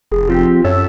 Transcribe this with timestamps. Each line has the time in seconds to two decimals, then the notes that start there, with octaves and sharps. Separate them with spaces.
0.12 F1 G#4
0.29 F3 C4 F4 G4
0.64 F#2 A4 C#5 E5